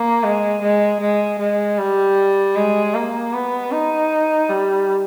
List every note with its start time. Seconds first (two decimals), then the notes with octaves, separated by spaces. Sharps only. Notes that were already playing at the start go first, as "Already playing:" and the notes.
Already playing: A#3
0.23 G#3
0.62 G#3
1.01 G#3
1.39 G#3
1.78 G3
2.56 G#3
2.94 A#3
3.33 B3
3.72 D#4
4.49 G3